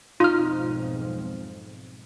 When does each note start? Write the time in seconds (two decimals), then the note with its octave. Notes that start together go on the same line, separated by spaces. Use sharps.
0.20 B1 F2 G#2 D#4 F4 F6